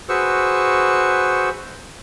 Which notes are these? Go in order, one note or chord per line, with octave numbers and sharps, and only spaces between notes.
F#4 G#4 B4 C5 C#6 E6